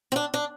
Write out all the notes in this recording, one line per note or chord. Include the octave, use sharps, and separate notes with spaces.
C4
D4
D4